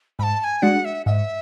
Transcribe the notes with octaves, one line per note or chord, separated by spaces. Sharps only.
G#2 A5 B5
A5
G#5
G#3 D4 F#4 F#5
E5
G#2 E5